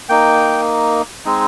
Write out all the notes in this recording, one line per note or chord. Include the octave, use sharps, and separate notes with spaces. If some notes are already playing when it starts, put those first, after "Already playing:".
A#3 D#4 G5
G#3 C4 D#4